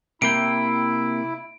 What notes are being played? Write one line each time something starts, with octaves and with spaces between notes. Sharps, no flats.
C3 A#3 E4 G5 D7